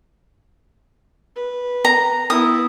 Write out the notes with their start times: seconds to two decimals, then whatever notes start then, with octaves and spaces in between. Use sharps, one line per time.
1.36 B4
1.85 A#5
2.30 B3 E4 D#6